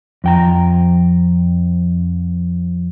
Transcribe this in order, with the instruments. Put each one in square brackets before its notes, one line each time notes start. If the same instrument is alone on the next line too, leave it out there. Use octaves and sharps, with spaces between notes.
[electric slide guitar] F2 G5 A#5